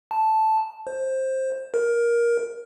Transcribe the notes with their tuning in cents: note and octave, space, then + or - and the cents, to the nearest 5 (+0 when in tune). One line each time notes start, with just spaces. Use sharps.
A5 -5
C5 +15
A#4 +15